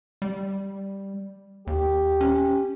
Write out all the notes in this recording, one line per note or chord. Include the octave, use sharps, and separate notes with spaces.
G3
D#2 G4
C#4